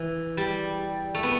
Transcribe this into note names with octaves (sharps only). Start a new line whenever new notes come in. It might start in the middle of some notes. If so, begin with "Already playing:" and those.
Already playing: E3
G3
A3
B3